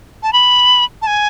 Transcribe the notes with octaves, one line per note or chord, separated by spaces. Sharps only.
A5
B5
A5
G#5